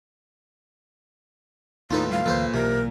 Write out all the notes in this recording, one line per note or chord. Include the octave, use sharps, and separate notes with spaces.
D#2 A2 D#4 F4 A4 B4
G3 F5
D2 A#2 E3 F#3 A4 B4 C5
B1 C3 E3 A#4